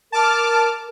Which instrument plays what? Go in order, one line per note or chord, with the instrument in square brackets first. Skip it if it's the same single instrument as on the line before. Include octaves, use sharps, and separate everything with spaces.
[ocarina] A#4 [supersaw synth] A5 D6 F6